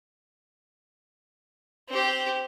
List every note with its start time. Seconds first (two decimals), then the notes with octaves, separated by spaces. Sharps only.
1.89 C4 G4